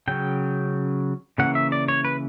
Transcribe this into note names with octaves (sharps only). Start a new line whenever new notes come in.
C#3 F#3 C#4 G5
C#3 E3 A#3 C#4 F#5
E5
D5
C#5
B4